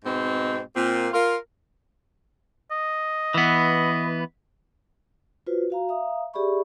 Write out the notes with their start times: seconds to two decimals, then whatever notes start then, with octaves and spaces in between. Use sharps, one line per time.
0.05 G#2 B2 C4
0.75 A#2 A#3 C4 F4
1.13 F4 A#4
2.71 D#5
3.34 E3 B3
5.47 F4 F#4 B4 C5
5.70 F#4 F5 A#5
5.89 E5 F5 A#5 D#6
6.34 G4 G#4 D5 E5 B5 C#6